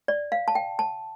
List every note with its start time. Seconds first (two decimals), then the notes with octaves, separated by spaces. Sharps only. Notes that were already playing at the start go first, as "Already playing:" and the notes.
0.08 D5
0.32 F5
0.48 A5
0.55 G5
0.79 A5